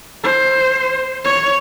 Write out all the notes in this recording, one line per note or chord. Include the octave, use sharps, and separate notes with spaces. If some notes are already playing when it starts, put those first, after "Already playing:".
C5
C#5